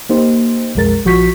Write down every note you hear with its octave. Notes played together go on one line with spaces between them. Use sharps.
A#3 D#4 G4 C5
B1 F2 G#3 A#4 A6
A#1 F3 F#4 C#6 G6 B6